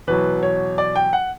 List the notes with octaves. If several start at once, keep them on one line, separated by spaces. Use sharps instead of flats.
E2 B2 F#3 B4
C#5
D5
G5
F#5